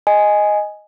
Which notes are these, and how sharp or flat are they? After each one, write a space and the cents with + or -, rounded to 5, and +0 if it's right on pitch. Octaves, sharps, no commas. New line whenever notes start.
D#5 +0 G#5 +0